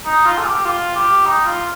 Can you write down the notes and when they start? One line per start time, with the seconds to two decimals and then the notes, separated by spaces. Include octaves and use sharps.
0.06 D#4
0.25 F4
0.38 A4
0.46 G4
0.65 F4
0.96 G4
1.26 D#4
1.45 F4